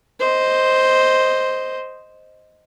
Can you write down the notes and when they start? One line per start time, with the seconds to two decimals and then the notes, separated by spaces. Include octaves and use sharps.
0.20 C5 D#5